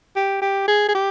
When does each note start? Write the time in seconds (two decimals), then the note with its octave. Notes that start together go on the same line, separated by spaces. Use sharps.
0.16 G4
0.42 G4
0.68 G#4
0.88 G#4
0.95 G4